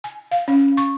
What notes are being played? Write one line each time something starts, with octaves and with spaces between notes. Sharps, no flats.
G#5
F5
C#4
C#6